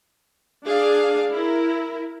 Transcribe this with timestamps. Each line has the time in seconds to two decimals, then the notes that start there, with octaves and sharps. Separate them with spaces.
0.65 D4 G#4 D5 F5
1.30 E4 A#4